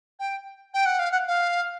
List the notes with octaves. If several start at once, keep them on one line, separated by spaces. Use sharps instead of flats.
G5
G5
F#5
F5
F#5
F5